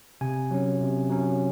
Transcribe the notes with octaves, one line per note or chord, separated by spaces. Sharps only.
C3 G#5
F#3 C#4
C3
F#3 C#4